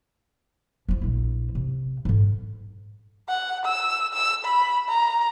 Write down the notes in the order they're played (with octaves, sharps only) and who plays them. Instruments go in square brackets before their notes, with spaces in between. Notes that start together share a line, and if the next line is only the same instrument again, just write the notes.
[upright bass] F3 F4
A#1 E4
C3
G#2 D3
[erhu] F#5
E6
E6
B5
A#5